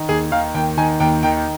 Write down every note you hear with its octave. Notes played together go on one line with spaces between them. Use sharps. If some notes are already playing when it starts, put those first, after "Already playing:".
Already playing: D#3
D#2 G#4
D#3 F5
D#2 G5
D#3 G#5
D#2 G5
D#3 G5